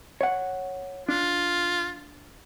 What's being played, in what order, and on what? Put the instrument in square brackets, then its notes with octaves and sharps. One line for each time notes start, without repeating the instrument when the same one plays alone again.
[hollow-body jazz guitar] C#5 F#5
[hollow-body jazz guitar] D4 [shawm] F4